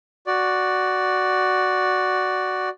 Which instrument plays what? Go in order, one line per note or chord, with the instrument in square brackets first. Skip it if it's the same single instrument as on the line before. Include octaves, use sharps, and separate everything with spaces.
[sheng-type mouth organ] F#4 D5